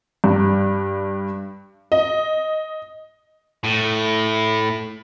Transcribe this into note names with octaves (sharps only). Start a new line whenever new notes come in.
G2
D#5
A2